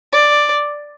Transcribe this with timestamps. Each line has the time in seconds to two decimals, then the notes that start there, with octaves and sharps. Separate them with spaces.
0.13 D5